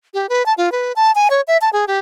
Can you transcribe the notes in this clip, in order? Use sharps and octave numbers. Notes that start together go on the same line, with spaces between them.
G4
B4
A5
F4
B4
A5
G#5
C#5
E5
A5
G#4
G4